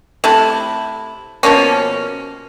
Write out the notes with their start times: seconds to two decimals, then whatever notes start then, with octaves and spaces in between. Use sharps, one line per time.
0.24 C3 A3 E4
1.43 B2 F3 A#3 C#4